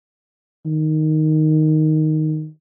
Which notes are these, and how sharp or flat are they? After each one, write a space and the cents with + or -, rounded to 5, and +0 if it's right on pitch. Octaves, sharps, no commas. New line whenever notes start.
D#3 +0